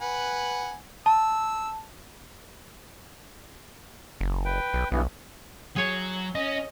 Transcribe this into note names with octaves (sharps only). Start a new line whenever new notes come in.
B4 F#5 G#5
A5 E6
F#1
B4 G5
B1
B1 G2 E3 B3
F#3 G#4 C#5
C#4 D#5